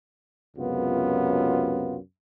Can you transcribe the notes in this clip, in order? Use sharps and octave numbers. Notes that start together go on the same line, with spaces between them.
C#2 F#2 C3 B3 F4